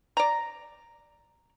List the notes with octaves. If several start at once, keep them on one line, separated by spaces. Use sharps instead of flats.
D5 A#5